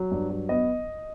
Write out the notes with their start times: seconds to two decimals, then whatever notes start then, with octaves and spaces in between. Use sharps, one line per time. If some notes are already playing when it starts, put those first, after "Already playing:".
Already playing: F#3
0.11 G2
0.30 F#3
0.49 B3 D#5